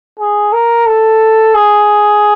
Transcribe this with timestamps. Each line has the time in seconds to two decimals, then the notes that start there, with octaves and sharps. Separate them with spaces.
0.19 G#4
0.53 A#4
0.86 A4
1.55 G#4